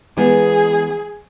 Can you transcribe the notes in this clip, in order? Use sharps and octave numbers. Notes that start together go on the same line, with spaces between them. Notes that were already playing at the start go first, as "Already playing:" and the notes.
E3 G#3 B3 G#4